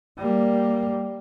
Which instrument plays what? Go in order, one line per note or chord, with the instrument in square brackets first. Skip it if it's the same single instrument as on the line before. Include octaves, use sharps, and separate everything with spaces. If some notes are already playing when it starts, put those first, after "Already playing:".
[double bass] G3 A#3